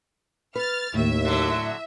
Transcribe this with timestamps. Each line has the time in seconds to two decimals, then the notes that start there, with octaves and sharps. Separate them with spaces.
0.56 B4 F6 A6
0.94 D#2 A2 E5
1.25 D3 F#3